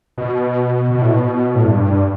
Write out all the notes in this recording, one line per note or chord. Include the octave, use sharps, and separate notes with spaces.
B2
B2
A2
B2
A2
G2